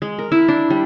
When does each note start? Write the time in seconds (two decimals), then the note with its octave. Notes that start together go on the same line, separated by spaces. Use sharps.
0.02 G#3
0.19 A#4
0.32 E4
0.48 D4
0.70 G3